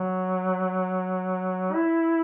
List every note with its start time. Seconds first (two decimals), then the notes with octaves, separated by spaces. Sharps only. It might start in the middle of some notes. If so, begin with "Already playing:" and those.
Already playing: F#3
1.73 E4